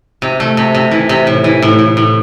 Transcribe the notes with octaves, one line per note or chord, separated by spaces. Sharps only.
C3
A3
C3
C3
E3
C3
A2
E3
A2
A2
A2